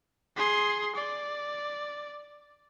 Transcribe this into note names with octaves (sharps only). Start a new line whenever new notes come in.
G#4 C6
D5